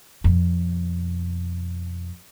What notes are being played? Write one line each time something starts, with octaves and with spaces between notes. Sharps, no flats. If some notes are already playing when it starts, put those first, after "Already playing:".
F2 B2